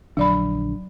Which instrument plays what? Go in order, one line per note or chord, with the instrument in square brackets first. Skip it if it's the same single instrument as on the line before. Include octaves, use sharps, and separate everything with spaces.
[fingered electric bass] A#1 D3 D4 [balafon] F#3 D5 B5